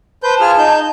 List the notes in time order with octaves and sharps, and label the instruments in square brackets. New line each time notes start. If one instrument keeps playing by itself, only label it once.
[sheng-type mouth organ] B4 C5 G6 [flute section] A5
[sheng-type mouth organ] F4 G#4 F6
D#4 G6